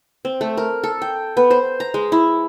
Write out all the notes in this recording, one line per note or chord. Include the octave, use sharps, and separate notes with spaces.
C4
A3
A#4
A4
G5
B3
C5
A#5
G#3
E4